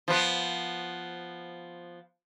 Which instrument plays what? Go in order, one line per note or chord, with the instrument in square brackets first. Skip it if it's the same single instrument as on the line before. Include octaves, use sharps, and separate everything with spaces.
[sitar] F3 B3